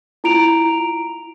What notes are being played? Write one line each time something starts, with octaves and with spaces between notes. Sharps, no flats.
E4 F4 A#5 D7 F7